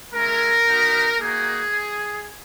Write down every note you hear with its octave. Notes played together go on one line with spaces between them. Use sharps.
G#3 C#4 E4 A#4
B3 D#4 F#4
A#3 D#4 F#4 G#4